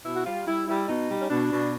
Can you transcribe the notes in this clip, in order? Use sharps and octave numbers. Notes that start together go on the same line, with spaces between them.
B2 E4
F#4
G3 F4
G3 E4
G3 E4
B2 D#4
G3
C#4
B2 D4
B2